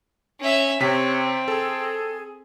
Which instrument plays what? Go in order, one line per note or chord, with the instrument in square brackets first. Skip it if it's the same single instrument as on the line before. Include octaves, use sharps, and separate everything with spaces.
[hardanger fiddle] C#4 E5
[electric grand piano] C3 B6 [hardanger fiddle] C4 [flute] C#5
[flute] G#4 [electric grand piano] A4